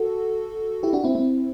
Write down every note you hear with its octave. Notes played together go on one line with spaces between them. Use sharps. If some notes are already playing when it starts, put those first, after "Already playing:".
Already playing: F#4 A4
E4 G4
D4 F#4
C4 E4
C4 E4